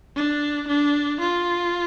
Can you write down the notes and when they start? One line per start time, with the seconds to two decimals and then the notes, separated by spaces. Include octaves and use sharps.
0.16 D4
0.68 D4
1.21 F4